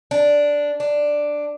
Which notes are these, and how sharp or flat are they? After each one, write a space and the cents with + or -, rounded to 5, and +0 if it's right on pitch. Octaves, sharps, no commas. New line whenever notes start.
D4 -5
D4 +5